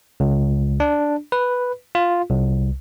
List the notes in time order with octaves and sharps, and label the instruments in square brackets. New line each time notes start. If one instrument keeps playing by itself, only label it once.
[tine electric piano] C#2
D4
B4
F4
C2